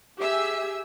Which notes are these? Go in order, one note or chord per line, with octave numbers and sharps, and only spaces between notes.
G4 G#4 E5 E6